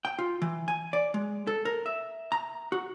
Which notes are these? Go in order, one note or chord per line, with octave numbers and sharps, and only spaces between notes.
G5
F4
E3
G#5
D5
G#3
A4
A#4
E5
A#5
F#4